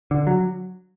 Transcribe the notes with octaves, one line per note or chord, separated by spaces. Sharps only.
D3
F#3